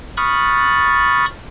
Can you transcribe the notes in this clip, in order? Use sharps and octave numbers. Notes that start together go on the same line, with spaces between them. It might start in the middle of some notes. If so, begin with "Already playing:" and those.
B5 C#6 D#6 F6 F#6 A6